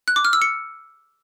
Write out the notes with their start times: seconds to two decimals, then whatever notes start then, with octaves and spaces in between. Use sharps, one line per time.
0.08 F#6
0.16 D6
0.25 F6
0.33 E6
0.42 C#7